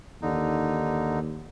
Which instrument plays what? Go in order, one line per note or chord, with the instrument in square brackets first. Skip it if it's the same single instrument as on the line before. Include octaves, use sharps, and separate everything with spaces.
[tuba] D#2 [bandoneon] D3 D#4